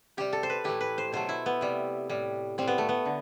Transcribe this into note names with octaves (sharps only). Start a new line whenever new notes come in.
C3 G3 G4
A4
C5
B4
A2 E3 A3 G4
B4
C5
B2 F#3 A3 C5
E4
B3
C3 G3
A2 G3
A2 G3 C4
B3
A3
B3
D3